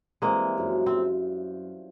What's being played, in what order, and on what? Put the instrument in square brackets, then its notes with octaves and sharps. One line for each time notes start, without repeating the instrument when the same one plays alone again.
[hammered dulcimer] E3 G3 C4 [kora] G#3 A#3
[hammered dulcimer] F#2 C#3 F3
[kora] C4